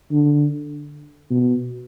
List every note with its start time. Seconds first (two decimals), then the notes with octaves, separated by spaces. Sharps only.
0.11 D3
1.30 B2